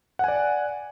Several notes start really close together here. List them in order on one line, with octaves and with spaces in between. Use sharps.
F#5 G#5 D5